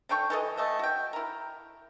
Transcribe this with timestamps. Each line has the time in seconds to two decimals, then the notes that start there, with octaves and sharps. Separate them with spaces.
0.09 D3 D4 G5 C#6
0.30 E3 A4 D#5
0.57 A3 D#5 E5
0.79 F#4 G5
1.13 E4 A#4